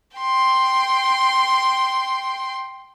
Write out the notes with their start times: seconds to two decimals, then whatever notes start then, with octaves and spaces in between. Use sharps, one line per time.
0.17 G5 C6